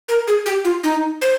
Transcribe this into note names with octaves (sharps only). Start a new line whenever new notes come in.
A#4
G#4
G4
F4
D#4
C5